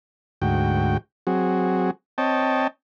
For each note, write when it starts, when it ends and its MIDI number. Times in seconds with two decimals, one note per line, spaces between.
0.42 0.97 38
0.42 0.97 44
0.42 0.97 66
0.42 0.97 79
1.27 1.91 54
1.27 1.91 60
1.27 1.91 66
1.27 1.91 68
2.18 2.67 60
2.18 2.67 73
2.18 2.67 75
2.18 2.67 79
2.18 2.67 81